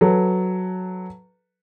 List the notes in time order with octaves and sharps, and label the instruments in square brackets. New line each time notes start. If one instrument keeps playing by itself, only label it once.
[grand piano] F#3 A4 B4